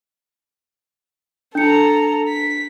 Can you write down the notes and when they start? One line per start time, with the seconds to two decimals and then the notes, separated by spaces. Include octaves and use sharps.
1.55 D4 A4 A#5 C#7
2.28 B6